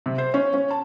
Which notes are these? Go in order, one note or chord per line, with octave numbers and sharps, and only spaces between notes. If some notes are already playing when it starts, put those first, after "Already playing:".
C3
C5
C#4
C#4
A5